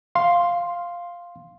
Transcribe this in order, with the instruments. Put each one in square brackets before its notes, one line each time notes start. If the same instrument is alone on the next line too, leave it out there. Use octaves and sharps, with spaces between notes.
[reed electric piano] F5 C6